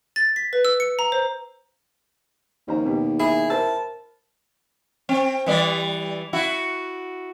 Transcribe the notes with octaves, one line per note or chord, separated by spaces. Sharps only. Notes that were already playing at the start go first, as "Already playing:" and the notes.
A6
B6
B4
E6
C#7
A#5
C5
D#2 C#4 C5 A#5
B2 G4
E4 G#4
A#4 C5 A5 E6
C4
E3 G3 D5
E4 F#4